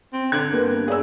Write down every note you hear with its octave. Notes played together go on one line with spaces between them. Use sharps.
C4
D3 F#6 G#6
G2 A#3 B3
G2 G#4 D5 E6